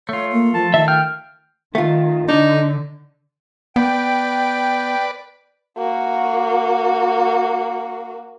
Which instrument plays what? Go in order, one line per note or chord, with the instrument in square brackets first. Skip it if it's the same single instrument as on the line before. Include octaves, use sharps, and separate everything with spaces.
[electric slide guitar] A3 F4 [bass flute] C#5
[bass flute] A#3
[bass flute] F3 [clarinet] A5
[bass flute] D#3 [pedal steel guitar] E5 [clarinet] A5
[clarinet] G5 [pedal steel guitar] F6
[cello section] D#3 [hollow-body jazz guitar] A3 F4
[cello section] D3 [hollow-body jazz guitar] D4 [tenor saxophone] D#4
[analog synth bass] B3 [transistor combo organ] B4 D5 [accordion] G5
[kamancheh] A#3 F#4